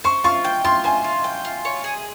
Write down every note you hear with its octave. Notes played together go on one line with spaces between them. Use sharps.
C5 C#6
F4 C#6
G5
F4 C6
C5 G#5
F4
G5
F4
C#5
G#4